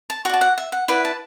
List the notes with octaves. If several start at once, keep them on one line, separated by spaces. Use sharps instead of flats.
A5
F#4 D5 F#5 A5
F#5
E5
F#5
E4 B4 D5 F#5
A5